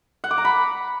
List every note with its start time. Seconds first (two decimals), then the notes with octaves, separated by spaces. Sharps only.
0.24 F#5
0.31 D6
0.38 A#5
0.45 B5